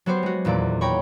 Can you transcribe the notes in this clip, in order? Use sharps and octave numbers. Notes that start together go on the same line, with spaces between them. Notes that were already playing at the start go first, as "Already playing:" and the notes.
F#3 B3 F#4 G4 C5
G#3 F#4
D#1 E2 A#2 D5 D7
C#5 G5 A#5 B5 C#6